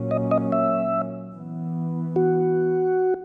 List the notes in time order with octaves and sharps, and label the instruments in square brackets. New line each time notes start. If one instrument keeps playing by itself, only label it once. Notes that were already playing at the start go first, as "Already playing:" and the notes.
Already playing: [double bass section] A#2 F#3 A#3 C#4
[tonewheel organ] D#5
D#5
E5
[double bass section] E3 B3
[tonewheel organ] F#4